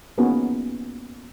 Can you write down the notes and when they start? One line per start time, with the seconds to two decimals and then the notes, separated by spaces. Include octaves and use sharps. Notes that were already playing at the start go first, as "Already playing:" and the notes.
0.18 A#3 B3 C#4 D#4 F#4 G#4